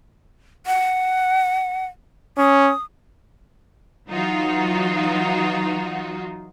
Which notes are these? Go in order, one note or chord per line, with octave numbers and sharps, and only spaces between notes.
F#5
C#4 D#6
E3 F#3 D#4 F4 F#4